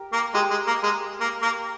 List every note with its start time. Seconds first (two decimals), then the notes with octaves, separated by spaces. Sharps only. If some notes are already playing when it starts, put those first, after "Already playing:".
Already playing: G4 A#4
0.13 A#3
0.34 G#3 G4 A#4
0.51 G#3
0.67 A#3
0.83 G#3
1.21 A#3
1.42 A#3